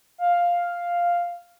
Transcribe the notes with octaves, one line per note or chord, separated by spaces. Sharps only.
F5